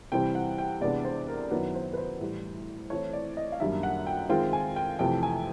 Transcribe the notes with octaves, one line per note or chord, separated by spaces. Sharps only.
C3 E3 G3 C4 G5
F#5
G5
C3 E3 G#3 B3 D4 D5
C5
A#4
F#2 D#3 F#3 B3 E4 B4
C5
B4
C5
A2 E3 G3
E3 A3 C4 E4 C#5
D5
D#5
F5
F#2 D#3 G3 A#3 D4 E5
F#5
G5
D#3 G#3 C4 F4 G5
G#5
G5
F2 C3 E3 A3 G5
G#5